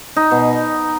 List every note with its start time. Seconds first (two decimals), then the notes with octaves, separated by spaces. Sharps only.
0.16 D#4
0.31 B2